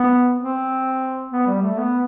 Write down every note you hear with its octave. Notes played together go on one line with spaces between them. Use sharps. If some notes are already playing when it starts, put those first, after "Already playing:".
Already playing: B3
C4
B3
G3
A3
B3